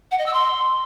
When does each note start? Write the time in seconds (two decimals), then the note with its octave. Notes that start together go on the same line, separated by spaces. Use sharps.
0.11 F#5
0.19 D#5
0.26 E6
0.33 C6